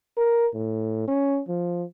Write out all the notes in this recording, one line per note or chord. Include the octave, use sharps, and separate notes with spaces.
A#4
A2
C#4
F3